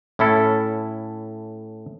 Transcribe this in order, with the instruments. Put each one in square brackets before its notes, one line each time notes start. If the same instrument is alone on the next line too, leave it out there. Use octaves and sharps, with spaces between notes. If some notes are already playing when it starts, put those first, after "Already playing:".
[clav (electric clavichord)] A2 C#4 E4 A4